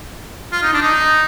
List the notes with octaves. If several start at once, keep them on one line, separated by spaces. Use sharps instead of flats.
F4
D#4
D4
D#4